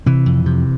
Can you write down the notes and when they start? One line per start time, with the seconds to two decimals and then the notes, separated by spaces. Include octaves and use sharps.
0.06 C3 E3
0.26 F2
0.46 C3